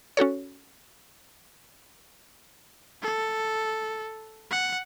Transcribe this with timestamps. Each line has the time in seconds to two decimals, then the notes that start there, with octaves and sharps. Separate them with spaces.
0.17 C#4 F#4 A4 C#5
3.03 A4
4.51 F#5